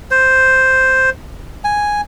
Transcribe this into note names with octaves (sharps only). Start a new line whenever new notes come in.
C5
G#5